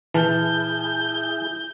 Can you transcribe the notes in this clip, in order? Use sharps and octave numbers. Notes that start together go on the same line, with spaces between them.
A#2 E3 E4 G#4 A5 F6 G6